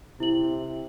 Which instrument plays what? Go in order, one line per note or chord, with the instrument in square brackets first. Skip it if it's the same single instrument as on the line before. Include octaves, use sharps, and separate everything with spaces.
[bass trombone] C3 [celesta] E4 F#7